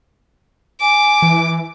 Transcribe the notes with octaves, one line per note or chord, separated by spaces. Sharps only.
G#5 D6
E3